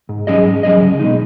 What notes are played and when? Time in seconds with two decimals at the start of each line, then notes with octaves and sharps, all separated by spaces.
0.09 G#2
0.27 F#3 C#4 G#4 D#5
0.45 G#2
0.63 F#3 C#4 G#4 D#5
0.81 C#2
1.00 B2 G#3 D#4